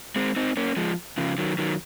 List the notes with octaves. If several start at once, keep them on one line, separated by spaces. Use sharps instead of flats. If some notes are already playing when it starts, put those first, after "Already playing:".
G#3 C4
C4 D#4
A#3 C#4
F3 G#3
C#3 F3
D#3 F#3
D#3 F#3